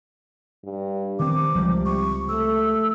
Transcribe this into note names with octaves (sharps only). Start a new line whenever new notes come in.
G2
C3 D#3 C4 D6
C#2 F3 G3
C#6
A3 E6